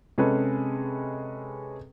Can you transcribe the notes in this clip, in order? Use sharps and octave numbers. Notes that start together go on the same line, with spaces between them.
C3 G#3 C#4 G#4 A4 B4